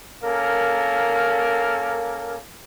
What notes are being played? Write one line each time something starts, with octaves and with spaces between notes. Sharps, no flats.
A#3 C#4 A4 A#4 F5